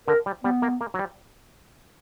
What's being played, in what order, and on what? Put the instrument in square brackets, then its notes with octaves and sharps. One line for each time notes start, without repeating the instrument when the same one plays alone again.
[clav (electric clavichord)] D3 [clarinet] A#4
[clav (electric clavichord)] G3
[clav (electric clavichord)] G3 [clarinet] B3
[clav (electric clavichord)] A#3
A#3
F#3
G3